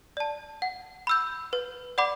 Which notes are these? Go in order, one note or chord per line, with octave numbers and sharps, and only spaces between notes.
D5 A5
F#5
B5 E6 G6
B4
D5 F#5 B5 D6